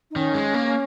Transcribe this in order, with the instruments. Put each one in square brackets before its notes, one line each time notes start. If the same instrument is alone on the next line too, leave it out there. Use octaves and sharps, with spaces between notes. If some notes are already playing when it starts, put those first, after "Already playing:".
[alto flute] D#4
[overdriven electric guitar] D#3 [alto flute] C#4
[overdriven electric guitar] G#3
A#3